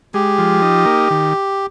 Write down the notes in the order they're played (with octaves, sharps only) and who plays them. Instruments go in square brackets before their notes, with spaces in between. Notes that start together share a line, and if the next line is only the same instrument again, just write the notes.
[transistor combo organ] G#3 [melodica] G4
[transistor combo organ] F3
D#4
A#3
D#3